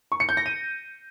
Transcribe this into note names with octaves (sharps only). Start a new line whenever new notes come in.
C#6
C#7
G6
A#6
D#7